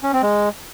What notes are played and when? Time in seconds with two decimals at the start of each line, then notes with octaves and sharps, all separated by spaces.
0.03 C#4
0.13 C4
0.23 G#3